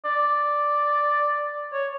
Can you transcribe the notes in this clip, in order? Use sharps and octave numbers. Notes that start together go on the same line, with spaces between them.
D5
C#5